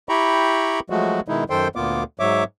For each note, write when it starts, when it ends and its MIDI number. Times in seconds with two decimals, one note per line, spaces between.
0.09 0.80 64
0.09 0.80 67
0.09 0.80 79
0.09 0.80 82
0.09 0.80 83
0.09 0.80 85
0.90 1.20 53
0.90 1.20 54
0.90 1.20 56
0.90 1.20 57
0.90 1.20 66
1.28 1.44 47
1.28 1.44 51
1.28 1.44 56
1.28 1.44 63
1.28 1.44 64
1.50 1.68 42
1.50 1.68 51
1.50 1.68 69
1.50 1.68 72
1.50 1.68 79
1.50 1.68 84
1.76 2.03 38
1.76 2.03 46
1.76 2.03 58
1.76 2.03 59
1.76 2.03 65
1.76 2.03 86
2.20 2.44 44
2.20 2.44 54
2.20 2.44 73
2.20 2.44 76
2.20 2.44 86